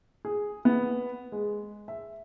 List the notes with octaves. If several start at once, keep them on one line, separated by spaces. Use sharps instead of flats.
G#4
B3
G#3
E5